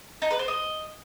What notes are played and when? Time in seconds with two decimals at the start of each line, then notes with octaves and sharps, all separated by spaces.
0.22 D#4
0.30 B4
0.39 C5
0.48 D#5